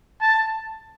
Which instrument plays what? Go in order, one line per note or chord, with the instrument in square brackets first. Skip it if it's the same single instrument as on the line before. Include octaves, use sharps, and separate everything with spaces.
[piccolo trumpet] A5